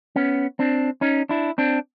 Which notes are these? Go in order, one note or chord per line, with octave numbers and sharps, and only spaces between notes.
B3 C#4
C4 D4
C#4 D#4
D4 E4
C4 D4